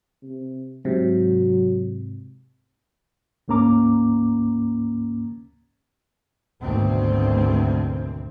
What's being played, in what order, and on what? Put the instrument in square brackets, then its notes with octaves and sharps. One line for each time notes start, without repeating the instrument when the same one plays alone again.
[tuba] C3
[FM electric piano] G#2 C3 [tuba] F#3
[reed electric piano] D2 G#2 A#3 C#4 A#5 D6
[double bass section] G#1 D2 B2 C4